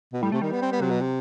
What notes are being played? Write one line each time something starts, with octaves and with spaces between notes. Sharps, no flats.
B2
A2 G3
C3 A3
D#3 G3
B3
C4
B3
C3 F#3
B2
C3